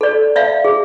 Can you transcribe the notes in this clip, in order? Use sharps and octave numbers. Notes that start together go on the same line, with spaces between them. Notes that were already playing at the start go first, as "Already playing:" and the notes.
A4 D5
D5 E5 F5
G#4